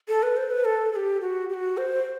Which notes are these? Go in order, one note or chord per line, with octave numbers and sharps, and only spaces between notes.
A4
B4
C5
B4
A4
A4
G4
F#4
G4
F#4
C5